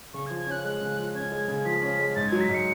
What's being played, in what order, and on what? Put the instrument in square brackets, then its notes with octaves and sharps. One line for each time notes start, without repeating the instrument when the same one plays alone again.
[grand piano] C#3 [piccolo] C#6
[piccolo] G#6
[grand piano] F3
[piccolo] G#6
[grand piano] C#4 [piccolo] F#6
[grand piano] G#3 [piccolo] F#6
[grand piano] C#3
F3
[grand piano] C#4 [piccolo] G#6
[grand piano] G#3
C#3
[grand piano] F3 [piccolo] B6
[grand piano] C#4
G#3
[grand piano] G#2 [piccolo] A6
[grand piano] F#3 [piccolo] G#6
[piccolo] B6
[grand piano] G#2
[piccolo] C#7